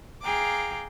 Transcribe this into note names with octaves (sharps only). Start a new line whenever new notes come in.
G#4 F5 G5 A#5 D6